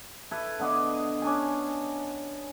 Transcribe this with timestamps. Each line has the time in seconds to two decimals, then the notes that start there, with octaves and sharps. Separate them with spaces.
0.31 E4 A4 B4
0.59 D3 B3 D5 D#5
1.22 C#4 D4 G#5